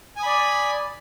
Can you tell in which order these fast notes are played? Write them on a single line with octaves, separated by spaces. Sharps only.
G#5 D#6 B5 D5